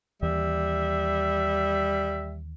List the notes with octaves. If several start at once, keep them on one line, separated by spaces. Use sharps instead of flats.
D#2 E3 G3 E5